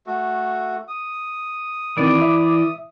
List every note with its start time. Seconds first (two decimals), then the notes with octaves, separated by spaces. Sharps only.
0.07 A3 F#4
0.88 D#6
1.97 D#3 E3 C4 D5
2.22 E5